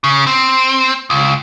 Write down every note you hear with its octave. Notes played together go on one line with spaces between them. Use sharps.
C#3
C4
C#2